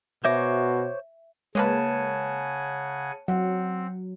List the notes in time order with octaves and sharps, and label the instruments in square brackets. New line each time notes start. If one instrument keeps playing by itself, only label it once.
[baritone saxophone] B2 [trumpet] F#4 [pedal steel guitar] C5 C#5 D6 [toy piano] E5
[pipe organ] C#3 F#5 G#5 [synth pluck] G#3 A#3 B4 [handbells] C#5 A5
[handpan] F#3 [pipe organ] C4 [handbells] F#5